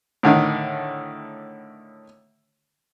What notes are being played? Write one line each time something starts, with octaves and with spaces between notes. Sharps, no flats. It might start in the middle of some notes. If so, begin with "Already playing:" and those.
A2 D3 D#3